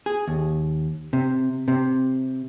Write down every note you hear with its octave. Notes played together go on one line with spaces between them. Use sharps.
G#4
D#2
C3
C3